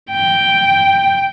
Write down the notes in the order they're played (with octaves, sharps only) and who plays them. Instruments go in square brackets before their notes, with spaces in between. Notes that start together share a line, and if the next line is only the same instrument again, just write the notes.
[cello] G5